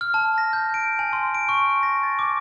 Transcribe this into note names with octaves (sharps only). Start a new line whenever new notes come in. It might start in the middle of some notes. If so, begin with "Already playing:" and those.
F6
A5
A#6
G6
D7
G#5
C6
D7
C#6
A#6
A6
D6